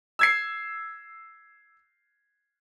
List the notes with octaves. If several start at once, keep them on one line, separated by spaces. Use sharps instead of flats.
E6 G#6 C7